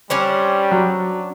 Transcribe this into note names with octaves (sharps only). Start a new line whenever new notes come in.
G3 C#4 D4 C5
F#3